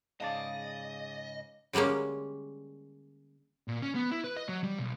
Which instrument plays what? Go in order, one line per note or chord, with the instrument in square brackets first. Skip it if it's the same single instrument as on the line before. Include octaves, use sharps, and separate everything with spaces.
[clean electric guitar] G#2 C#3 D5 [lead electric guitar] D#5 [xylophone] F5 A5
[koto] D3 G3 G#3 A#3 C#4
[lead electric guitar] A#2
C#4
B3
E4
B4
D#5
F#3
G3
B1